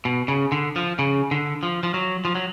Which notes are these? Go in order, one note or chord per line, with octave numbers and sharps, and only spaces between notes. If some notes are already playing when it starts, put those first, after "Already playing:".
B2
C#3
D3
F3
C#3
D3
F3
F3
F#3
F3
F#3